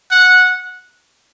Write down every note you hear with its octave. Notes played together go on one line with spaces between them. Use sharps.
F#5